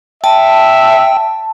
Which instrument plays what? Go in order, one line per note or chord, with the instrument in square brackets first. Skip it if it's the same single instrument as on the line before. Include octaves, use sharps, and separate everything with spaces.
[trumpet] E5 [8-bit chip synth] G5 [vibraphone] A5